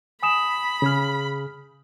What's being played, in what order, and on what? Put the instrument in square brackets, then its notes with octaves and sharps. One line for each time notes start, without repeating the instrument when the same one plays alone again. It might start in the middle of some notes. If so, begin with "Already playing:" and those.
[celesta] G#5 D#6 E7 [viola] B5
[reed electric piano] C#3 G#4 F6